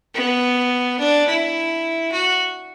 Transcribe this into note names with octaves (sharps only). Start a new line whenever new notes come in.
B3
D4
E4
F#4